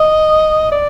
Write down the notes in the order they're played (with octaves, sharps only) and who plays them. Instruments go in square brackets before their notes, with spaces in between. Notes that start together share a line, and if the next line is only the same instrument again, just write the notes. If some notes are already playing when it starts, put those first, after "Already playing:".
Already playing: [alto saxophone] D#5
D5